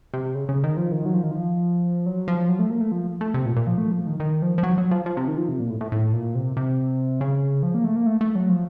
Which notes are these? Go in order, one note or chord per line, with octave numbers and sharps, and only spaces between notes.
C3
C#3
C#3
D#3
F3
D#3
F#3
F3
D#3
F3
F#3
F3
F#3
A3
A#3
A3
F3
A3
C3
A#2
A#2
F3
A3
F3
D#3
D#3
F3
F3
F#3
F#3
F3
F3
C3
D#3
F3
C3
A#2
A2
A2
A2
A#2
C3
C3
C#3
F3
A#3
A3
A#3
A3
A3
F#3
F3